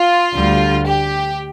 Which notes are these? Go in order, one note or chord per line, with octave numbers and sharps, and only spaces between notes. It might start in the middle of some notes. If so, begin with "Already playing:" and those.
Already playing: F4
D2 D3 G3
G4